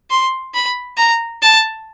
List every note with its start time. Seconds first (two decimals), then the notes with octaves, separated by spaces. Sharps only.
0.10 C6
0.54 B5
0.97 A#5
1.42 A5